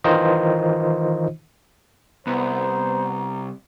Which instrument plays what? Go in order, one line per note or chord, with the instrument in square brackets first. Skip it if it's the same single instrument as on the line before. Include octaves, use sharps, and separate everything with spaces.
[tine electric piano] D#3 E3 D#4 F4 C5 D#5
[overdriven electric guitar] C2 [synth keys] B3 [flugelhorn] C5 [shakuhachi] A#5